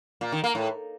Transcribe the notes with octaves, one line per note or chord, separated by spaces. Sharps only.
A#2
D#3
A#3
A2